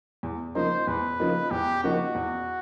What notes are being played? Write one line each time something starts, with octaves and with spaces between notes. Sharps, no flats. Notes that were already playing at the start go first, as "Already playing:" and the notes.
E2
C#3 F3 A#3 D#4 C5
E2 B4
C#3 F3 A#3 D#4
E2 G4
C#3 F3 A#3 D#4 F#4
E2